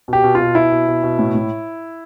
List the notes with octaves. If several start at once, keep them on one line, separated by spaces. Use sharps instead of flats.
B2 G4
B2
B2 F4
B2 E4
B2
B2
B2
A2
A2